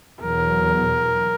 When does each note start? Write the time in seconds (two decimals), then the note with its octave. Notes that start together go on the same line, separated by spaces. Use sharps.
0.22 E2 B2 F#3 A#4